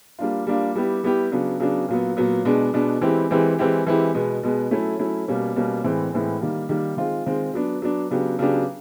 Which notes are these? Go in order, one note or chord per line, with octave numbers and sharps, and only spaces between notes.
G3 A#3 D4 F4
G3 A#3 D4 F4
G3 B3 E4 G4
G3 B3 E4 G4
C#3 F#3 B3 D4
C#3 F#3 B3 D4
A#2 F#3 B3
A#2 F#3 B3
B2 G#3 B3 D4
B2 G#3 B3 D4
E3 G#3 C4 E4 G4
E3 G#3 C4 E4 G4
E3 G#3 C4 E4 G4
E3 G#3 C4 E4 G4
B2 G#3 B3
B2 G#3 B3
F#3 A3 C#4 E4
F#3 A3 C#4 E4
B2 G3 A#3 C#4
B2 G3 A#3 C#4
A2 E3 G#3 C4
A2 E3 G#3 C4
D#3 G3 A#3
D#3 G3 A#3
D#3 G#3 C4 F4
D#3 G#3 C4 F4
F#3 B3 D4
F#3 B3 D4
C#3 F#3 B3 D4 G4
C#3 F#3 B3 D4 G4